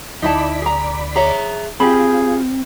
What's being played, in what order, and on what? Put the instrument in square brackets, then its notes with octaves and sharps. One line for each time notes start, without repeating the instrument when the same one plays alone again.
[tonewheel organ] D2 D5 B5 [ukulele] D#4 E4 A5
[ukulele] G#4 A#5
[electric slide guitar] G#4 E5 [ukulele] C#5 A#5
[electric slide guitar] C4 [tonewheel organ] F4 [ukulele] G4 B5 [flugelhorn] G#4